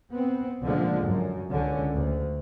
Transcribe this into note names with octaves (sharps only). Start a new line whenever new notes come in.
B3 C4
C#2 A#2 D3 F3 G#3
F#2
C#2 D3 C#4
D2